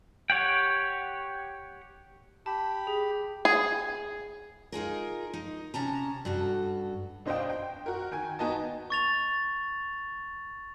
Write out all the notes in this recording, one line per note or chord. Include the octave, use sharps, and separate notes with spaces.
G4 C#5 F#5 G5
G4 A5 B5
G#4
G#4
D#4 F4 G#4 A#4
D#4
C3 C#4 A5 A#5
G2 F#4 A4
B2 D4 C5 D#5 F5 G5
G5
F#4 A#4
D#3 G5 G#5
B3 D#4 F#4 D#5 G#5 A5
C#6 A6 F7